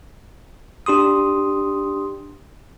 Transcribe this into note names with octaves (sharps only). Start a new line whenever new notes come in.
D4 G4 C6 D#6